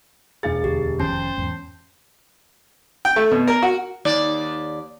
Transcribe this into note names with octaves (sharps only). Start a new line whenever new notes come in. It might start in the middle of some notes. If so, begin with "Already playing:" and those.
E1 G#4 F5 A6
D2 G4
F1 D#3 F3 C#4 C5 A5
E2 G#2
G5
A3
B2
A#4
F#4
D#2 D5